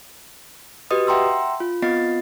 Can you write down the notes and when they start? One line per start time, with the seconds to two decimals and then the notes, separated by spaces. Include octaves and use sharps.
0.91 F#4 G4 B4 D#5 D#6
1.07 E5 F#5 G5 A#5 C6 E6
1.60 F4
1.82 B3 C4 F4 D#5 A6 C7